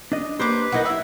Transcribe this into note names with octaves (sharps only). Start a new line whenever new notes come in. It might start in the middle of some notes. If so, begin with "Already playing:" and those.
D4 D#5
A#3 D4 G4 B4 C5 D6
B1 D#4 E4 A#4 D#5 F#5
E4 E5 F#5